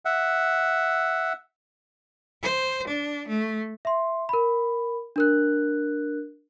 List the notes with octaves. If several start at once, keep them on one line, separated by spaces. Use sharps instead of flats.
E5 F#5
C5
D4
A3
E5 C6
A#4 B5
D4 A#4 F#6